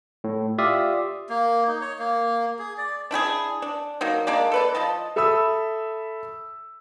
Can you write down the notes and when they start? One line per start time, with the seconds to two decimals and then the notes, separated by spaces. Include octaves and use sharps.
0.24 A2
0.58 F4 G4 D5 E5 F5 D#6
1.29 A#3
1.68 D#4
1.81 C#5
1.99 A#3
2.59 G#4
2.78 D5
3.11 D4 E4 G4 G#4
3.62 D4
4.01 F#3 A#3 D#4
4.27 G#3 A#3 D4 D5
4.51 A4 B4 D5
4.75 F3 D#5 A5
5.16 A4 E5 B5 D#6 E6